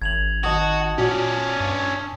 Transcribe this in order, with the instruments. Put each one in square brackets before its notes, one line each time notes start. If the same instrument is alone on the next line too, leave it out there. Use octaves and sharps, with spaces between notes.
[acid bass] G#1 [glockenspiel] G#6 F7 F#7
[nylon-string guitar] D#3 D#5 [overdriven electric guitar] F#4 [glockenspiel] A5 D#6 F#7
[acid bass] A#2 [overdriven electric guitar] C#4 D5 [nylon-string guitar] F#4
[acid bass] G2